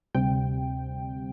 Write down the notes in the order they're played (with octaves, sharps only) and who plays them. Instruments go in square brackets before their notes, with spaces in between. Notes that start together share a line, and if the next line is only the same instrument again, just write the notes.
[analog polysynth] D2 C3 G3 C4 G5